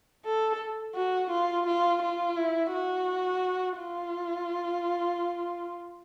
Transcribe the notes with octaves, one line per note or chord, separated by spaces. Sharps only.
A4
F#4
F4
F4
F4
E4
F#4
F4